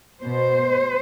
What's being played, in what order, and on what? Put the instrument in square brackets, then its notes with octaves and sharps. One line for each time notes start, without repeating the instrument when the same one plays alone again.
[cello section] B2 C5